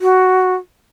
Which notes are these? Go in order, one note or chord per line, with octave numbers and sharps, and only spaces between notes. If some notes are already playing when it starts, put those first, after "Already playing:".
F#4